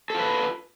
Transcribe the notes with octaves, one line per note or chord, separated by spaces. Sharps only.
F4 A4 B4